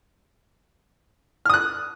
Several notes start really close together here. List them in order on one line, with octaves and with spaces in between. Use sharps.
F6 D#6 F#6